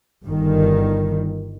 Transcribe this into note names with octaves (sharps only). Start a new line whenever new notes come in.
G1 G2 D#3